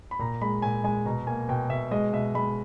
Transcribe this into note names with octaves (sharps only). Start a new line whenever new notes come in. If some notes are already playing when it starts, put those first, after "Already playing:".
B5
A#2 A#5
G#3 B5
A#2 G#5
G#3 G#5
B2 A#5
A#3 G#5
B2 G5
B2 E5
G#3 D#5
B2 E5
G#3 B5